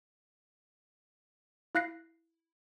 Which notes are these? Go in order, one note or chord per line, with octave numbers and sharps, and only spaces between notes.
E4 F5 F#6 A#6 C7